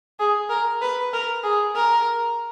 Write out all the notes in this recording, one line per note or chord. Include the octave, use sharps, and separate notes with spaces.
G#4
A#4
B4
A#4
G#4
A#4